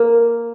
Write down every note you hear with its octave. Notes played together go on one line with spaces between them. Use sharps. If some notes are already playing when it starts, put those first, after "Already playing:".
Already playing: A#3